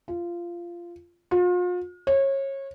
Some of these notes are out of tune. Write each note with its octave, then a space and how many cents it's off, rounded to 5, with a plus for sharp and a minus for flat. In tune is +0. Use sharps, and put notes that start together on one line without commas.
F4 -15
F4 +40
C#5 -25